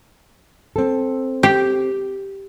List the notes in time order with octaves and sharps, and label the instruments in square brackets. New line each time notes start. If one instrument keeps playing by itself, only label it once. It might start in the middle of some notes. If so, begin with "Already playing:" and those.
[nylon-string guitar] C4 A4
[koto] G4